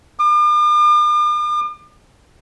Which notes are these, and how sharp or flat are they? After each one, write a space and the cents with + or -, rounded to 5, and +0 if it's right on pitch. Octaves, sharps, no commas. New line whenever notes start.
D6 +45